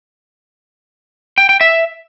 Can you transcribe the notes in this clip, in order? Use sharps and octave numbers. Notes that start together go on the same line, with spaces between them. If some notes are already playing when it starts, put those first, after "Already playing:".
G5
G5
E5